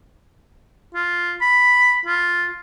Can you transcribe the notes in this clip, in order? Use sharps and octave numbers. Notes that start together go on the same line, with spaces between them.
F4
B5
F4